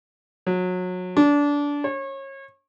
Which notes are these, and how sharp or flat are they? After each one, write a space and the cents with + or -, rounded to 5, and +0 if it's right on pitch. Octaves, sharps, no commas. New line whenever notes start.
F#3 -25
D4 -20
C#5 -30